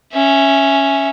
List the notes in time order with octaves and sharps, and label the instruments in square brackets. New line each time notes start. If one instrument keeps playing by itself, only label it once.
[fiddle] C#4 E5